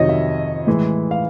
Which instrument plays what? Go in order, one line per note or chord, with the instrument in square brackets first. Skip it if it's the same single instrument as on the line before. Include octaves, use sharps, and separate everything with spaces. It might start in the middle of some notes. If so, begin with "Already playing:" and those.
Already playing: [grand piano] F2 C3 D#3 F#3 C#5 D#5
E5
A2 E3 G#3
F5